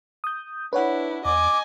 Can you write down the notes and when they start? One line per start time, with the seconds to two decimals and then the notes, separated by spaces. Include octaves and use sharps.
0.24 D#6 G6
0.73 D4 E4 B4 C#5 F#5
1.25 E2 D#5 G#5 D6